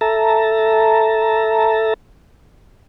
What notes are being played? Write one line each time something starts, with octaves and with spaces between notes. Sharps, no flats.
A4 E5 A5 A#5